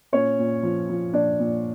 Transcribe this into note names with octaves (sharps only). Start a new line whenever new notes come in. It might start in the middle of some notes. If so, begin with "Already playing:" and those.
A#2 C#4 C#5
A#2
F3
F3
A#2 D4 D5
A#2